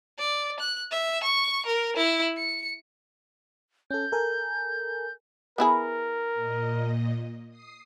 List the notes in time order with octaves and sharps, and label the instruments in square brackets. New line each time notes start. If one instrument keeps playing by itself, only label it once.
[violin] D5
F#6
E5
C#6
A#4
E4
C#7
[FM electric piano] C#4 A4 [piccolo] G6
[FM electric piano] A4 A#4 G#5
[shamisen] B3 E4 G#4 [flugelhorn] A#4
[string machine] A#2 D#5
D#6 C7